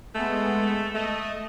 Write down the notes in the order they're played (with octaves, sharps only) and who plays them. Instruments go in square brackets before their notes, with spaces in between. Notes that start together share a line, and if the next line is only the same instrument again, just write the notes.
[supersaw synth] G#3 B3 [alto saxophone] A3
[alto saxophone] A3 [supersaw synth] D#5